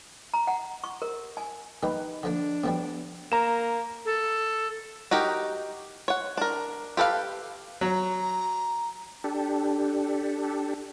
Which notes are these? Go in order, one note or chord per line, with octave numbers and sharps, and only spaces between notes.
A#5
F#5
C#6
A#4
G#5
G2 D#3 A#3 D#4 B4
D3 F3 A#3 D4
A2 F3 G3 B3
A#3 A#5 E7
A4
D#4 F#4 G4 A#4
C#5 F#5
D4 A#4
G4 A4 B4 F5
F#3 A#5
D4 G4 A4